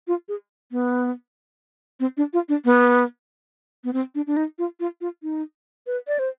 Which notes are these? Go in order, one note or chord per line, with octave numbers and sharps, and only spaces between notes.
F4
G#4
B3
C4
D4
F4
D4
B3
B3
C4
D4
D4
D#4
F4
F4
F4
D#4
B4
D5
C5